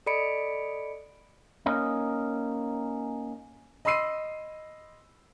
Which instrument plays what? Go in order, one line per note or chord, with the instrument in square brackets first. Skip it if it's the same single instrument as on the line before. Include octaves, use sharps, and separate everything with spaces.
[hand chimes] A4 D5 D#5 B5 C#7 D7
[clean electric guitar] A#3 C#4 D#4
[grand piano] D#5 B5 C6 E6 C7 D#7